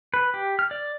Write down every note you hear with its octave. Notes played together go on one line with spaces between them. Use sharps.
B4
G4
F6
D5